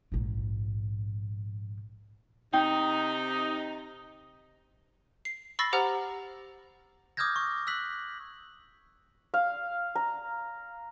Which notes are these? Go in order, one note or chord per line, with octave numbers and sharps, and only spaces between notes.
A#1 G#2
C3 D#4 G5
C7
B5 C#6 E6 A6 A#6 C7
G4 C5 F#5 A#5 F6
D6 D#6 F6 G6 G#6 A#6
C#6
E6 F#6 B6 F#7
F5
A#5